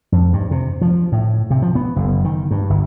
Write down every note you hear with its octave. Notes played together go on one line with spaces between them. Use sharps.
F2
G2
C3
F3
A2
C3
F3
B3
F#1
D#3
G2
G1